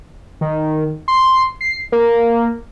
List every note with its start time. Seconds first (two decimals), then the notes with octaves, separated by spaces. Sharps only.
0.41 D#3
1.08 C6
1.61 C7
1.92 A#3